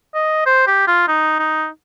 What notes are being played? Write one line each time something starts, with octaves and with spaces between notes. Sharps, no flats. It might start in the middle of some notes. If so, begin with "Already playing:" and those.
D#5
C5
G4
F4
D#4
D#4